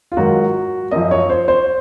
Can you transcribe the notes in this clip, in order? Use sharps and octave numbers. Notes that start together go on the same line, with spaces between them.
F4
G#2 D#3 F#3 F#4
F#2 F3 D#5
C#5
C5
C5